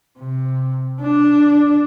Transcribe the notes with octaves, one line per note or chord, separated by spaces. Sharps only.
C3
D4